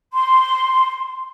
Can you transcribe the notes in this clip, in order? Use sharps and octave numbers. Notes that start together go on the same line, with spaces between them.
C6